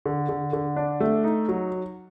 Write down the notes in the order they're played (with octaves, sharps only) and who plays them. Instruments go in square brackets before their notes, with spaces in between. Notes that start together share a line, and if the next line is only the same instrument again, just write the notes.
[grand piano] D3
D3
D3
D4
A3
D#4
F#3